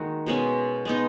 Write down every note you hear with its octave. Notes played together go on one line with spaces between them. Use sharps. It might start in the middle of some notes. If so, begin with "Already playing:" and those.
Already playing: D#3 G#3 A#3 D#4 F#4
B2 G#3 C#4
G#3 B3 D#4